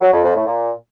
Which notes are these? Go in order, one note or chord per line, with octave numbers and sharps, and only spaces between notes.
F#3
F2
F2
A2
A#2